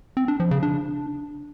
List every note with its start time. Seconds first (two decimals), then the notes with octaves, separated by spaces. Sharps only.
0.17 C4
0.28 D4
0.40 F3
0.51 C#3
0.63 D4